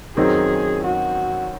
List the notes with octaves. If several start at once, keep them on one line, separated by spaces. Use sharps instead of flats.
F#2 D#3 F#3 C4 D#4 G#4
F#4